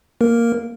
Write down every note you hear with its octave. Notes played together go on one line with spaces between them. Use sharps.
A#3 A#4